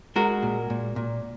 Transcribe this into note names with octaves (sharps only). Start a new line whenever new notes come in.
G#3 F#4 A#4
A#2
A#2
A#2